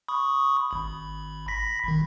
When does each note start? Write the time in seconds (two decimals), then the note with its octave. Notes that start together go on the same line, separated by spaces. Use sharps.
0.08 B5 C#6 D#6
0.71 G#1 B5
1.48 B5 A#6 B6
1.84 G#1 D#3